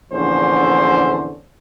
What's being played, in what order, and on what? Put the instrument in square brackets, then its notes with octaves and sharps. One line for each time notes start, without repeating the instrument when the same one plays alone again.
[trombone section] A#1 E2 D3 C#4 C5